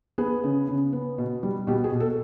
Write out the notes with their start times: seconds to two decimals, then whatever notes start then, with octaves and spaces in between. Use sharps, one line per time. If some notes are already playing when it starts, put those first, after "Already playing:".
0.18 B3 G#4
0.44 C#3
0.68 C#3
0.93 B3
1.18 B2
1.43 G3
1.67 B2 G4
1.84 G#4
1.92 B2
2.00 A4